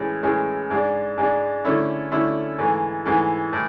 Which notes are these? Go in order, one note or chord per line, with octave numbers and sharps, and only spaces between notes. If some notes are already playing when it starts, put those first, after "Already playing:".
Already playing: A2 E3 G#3 C#4
A2 E3 G#3 C#4
G#2 G#3 D4
G#2 G#3 D4
D3 A3 C#4 E4
D3 A3 C#4 E4
G#2 E3 A3
G#2 E3 A3
A2 E3